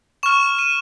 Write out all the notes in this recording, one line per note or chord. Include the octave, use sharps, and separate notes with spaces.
C#6 F6 E7
D#7